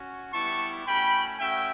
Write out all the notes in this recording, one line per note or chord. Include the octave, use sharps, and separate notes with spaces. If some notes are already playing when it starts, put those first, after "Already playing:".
Already playing: C#4 F#4
G3 B3 E4 G4 A5 C#6
A3 C#4 F#4 G5 B5
A3 C#4 F#4 E5 G5